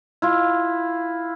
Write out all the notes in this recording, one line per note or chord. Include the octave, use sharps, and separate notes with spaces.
E4 F4